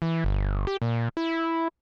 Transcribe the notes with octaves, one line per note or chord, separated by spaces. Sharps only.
E3
G1
G4
A#2
E4